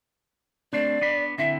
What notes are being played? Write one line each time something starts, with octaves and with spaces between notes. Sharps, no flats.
A3 C4 D4 D5
B3 D4 B5
D3 C4 E4 E5